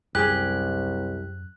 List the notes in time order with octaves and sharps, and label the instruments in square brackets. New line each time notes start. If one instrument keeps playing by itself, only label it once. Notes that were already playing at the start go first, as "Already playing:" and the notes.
[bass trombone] C2 [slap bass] F#2 [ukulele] G4 G#4 [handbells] F#6